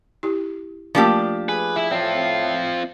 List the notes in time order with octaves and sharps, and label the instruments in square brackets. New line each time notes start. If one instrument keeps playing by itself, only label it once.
[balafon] E4 G4
[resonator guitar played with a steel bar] F3 D4 G4 [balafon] A3 A#3 A#4
[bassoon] G#4 [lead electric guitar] B4
[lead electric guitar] E4 [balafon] E5
[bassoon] A2 [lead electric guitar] C4 F4 [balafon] D5